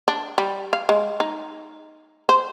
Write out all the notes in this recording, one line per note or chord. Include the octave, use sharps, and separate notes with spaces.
D4
G3
F5
G#3
D#4
C5